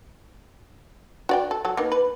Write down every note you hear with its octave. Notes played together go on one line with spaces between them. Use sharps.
F#4 D5 G5
A4
F#3 A4
A#3 B3 D#4
B4